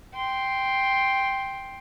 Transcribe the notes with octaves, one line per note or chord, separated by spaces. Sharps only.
G5 C6